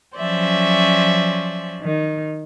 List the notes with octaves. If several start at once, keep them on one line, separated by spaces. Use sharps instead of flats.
F3 F#3 C#4 C5 D5 E5
D#3